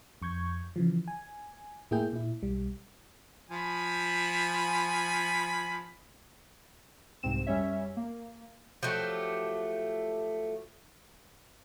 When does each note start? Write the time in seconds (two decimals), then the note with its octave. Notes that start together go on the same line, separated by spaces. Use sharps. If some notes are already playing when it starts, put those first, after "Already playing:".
0.22 F2 C#6 G6 G#6
0.76 C#3 E3 F3
1.08 G#5
1.91 A2 A#3 E4 G#4 G5 G6
2.13 A#2 E4
2.42 B1 G3
3.51 F3 G#5 B5
7.23 C2 G#2 C3 C4 E7
7.47 F#2 G3 C#4 C#5 E5
7.97 A#3
8.83 F3 F#3 A3 G4